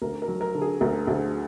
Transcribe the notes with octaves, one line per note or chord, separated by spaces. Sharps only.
D2 A#4
A#4
F#3
A#4
D3
G#4
D2 A#4
D2